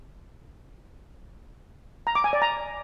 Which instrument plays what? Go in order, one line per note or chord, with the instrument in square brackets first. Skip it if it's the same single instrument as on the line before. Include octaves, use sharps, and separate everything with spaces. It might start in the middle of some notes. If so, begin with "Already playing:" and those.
[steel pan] A#5
D6
G#5
D5
A#5